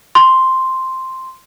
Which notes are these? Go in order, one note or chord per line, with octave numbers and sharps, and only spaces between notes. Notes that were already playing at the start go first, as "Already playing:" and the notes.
C6